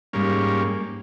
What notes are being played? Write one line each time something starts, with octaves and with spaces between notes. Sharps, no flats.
G#2 G3 A#3 C#4